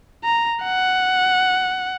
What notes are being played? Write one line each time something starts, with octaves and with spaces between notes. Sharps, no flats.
A#5
F#5